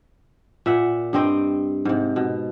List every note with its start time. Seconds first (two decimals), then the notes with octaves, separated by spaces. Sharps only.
0.66 A#2 E5 F#5
1.13 G2 C4 D#5 G5
1.85 G#2 C3
2.16 B2